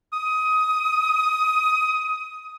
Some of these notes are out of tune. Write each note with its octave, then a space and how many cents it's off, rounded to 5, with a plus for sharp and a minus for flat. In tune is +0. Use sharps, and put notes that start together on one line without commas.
D#6 +20